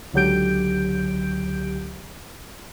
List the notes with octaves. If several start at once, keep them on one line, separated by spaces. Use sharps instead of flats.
C#2 D3 F#3 G4 G6 D7